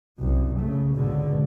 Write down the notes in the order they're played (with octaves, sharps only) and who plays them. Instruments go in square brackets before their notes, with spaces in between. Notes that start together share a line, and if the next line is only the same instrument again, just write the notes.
[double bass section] C2 F#2
C#3 A3
G#1 C#2 B2 D3